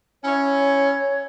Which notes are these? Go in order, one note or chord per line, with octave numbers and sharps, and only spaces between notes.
C#4 E4 C#5